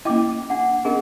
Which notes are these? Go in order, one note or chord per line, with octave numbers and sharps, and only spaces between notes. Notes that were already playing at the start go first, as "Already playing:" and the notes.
A#3 C#4 E4 D#5 G5 D6
D4 F#5
B3 C#4 D4 G#4 A#4 D#5